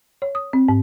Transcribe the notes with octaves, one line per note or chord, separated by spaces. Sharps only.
C#5
D#6
C4
G#2